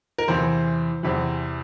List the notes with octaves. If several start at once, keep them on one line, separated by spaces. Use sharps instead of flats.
A#4
E2 C3 E3 C5
E2 C3 E3